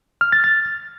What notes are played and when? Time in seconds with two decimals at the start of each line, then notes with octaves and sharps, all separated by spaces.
0.21 F6
0.32 A6
0.44 A6